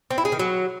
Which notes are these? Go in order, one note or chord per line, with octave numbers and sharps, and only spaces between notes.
C4
E4
G#4
D#3
F#3